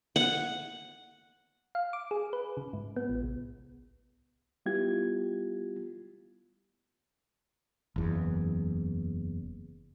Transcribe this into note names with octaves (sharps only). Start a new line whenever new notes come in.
F#5
F5
D6
G#4
B4
C#3
G#2
B3
A1
C2
G3 B3 E4 F4 G4 G#6
F#1 E2